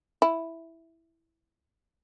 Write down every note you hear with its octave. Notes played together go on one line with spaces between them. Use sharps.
E4